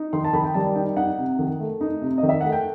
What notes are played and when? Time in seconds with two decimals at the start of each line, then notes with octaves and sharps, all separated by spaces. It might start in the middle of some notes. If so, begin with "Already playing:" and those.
Already playing: D#4
0.13 D#3 C6
0.25 A5
0.33 D#3 B5
0.44 G5
0.54 G3 A5
0.75 D#4 G5
0.97 D#4 F#5
1.18 C3
1.39 D#3
1.60 A3
1.81 D#4
2.01 C3
2.18 D#5
2.23 D#3
2.29 E5
2.41 A3 F#5
2.52 G5